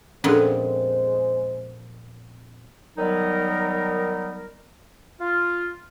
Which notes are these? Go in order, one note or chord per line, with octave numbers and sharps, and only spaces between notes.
F2 A#2 G#3 B3 C#4 D4 G#4 C5
D#3 F#3 G3 B3 D#4 A#4
F4